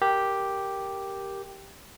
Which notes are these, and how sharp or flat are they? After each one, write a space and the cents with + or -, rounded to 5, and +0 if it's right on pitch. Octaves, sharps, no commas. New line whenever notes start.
G4 +0 A#4 +0